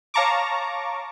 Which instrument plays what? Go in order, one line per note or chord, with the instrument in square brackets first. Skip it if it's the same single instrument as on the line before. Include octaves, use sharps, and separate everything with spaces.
[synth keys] C#5 F5 A5 A#5 C#6 D6